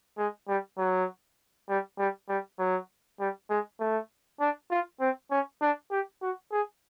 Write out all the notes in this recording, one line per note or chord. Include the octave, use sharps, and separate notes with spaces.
G#3
G3
F#3
G3
G3
G3
F#3
G3
G#3
A3
D4
F4
C4
C#4
D4
G4
F#4
G#4